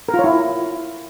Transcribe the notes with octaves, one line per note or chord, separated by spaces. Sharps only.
A#4
F4
C#5
E4